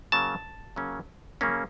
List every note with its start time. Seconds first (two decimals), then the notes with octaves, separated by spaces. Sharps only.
0.12 C#3 F#3 A#3 C#4 A5
0.76 C#3 F#3 A#3 C#4
1.41 C#3 F#3 A#3 C#4